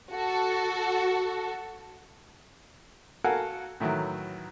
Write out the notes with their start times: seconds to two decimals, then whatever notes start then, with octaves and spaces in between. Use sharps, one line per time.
0.11 F#4 A4
3.24 F#4 A4 A#4 F5 F#5 G#5
3.80 A2 D#3 E3 F#3